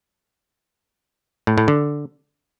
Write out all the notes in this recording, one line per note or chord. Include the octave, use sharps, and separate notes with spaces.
A2
A2
D3